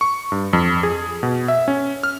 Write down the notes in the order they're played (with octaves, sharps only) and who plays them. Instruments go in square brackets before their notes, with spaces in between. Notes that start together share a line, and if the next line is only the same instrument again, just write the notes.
[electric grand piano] C#6
G2
F2
G#4
B2
E5
C#4
F6